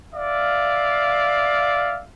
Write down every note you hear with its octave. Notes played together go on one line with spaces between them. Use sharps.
D5 E5 F5